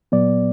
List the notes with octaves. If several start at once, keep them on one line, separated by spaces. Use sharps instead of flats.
A#2 F#3 B3 D5